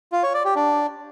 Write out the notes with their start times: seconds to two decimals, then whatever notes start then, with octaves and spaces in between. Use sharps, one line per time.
0.12 F4
0.23 C#5
0.34 D5
0.45 G4
0.56 D4